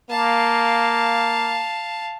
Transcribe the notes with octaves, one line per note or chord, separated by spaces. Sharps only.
A#3 F5 A5